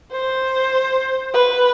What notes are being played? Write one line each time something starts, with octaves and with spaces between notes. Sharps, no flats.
C5
B4